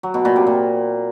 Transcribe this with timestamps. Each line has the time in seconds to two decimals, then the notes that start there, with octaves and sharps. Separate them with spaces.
0.03 F#3
0.14 B2
0.25 A#2
0.36 C3
0.47 A#2